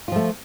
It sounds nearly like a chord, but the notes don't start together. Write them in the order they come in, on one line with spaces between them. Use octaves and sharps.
F4 F3 A3